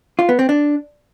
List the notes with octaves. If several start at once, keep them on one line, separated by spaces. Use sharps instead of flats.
F4
B3
C4
D4